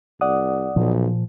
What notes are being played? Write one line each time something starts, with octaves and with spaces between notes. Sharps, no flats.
C2 D5 F#5 D#6
B1 A#2 F3